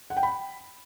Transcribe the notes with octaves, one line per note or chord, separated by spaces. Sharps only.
F#5
G5
B5